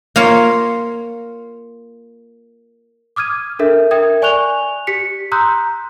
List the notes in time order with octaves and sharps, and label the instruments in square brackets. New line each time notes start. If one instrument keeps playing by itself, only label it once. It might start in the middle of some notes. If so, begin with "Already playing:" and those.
[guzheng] A#3 F4 C#5
[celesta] D6 D#6 F6 G#6 D#7
D4 A4 A#4 E5
A#4 E5 G5 D#6 G#6
D5 G#5 C#6 F#6 F7 G7
G4 B6 C#7
A#5 C6 D#6 E6 F#6 G6